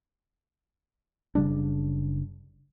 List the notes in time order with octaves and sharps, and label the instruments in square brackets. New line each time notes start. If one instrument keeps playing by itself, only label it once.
[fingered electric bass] F#1 C#3 G3 D4